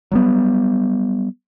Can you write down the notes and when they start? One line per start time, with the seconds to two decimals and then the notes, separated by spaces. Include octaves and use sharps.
0.11 F#3 G3 B3